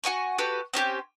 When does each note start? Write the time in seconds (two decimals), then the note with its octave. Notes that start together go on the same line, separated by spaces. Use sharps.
0.04 F#4 F#5 G#5 C#6
0.38 F#4 G4 A4 B4
0.73 C4 C#4 G4 D6